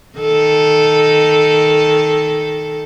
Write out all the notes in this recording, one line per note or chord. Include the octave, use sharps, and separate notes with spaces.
D#3 A4